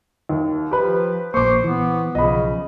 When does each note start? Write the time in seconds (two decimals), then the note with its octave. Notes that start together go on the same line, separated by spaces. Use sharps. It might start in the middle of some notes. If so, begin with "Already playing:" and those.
0.29 D#2
0.71 F3 G4 B4
1.34 A#1 A#3 C5 C#6 D6
1.64 E3 B3
2.15 B1 C#3 F3 D#5 B5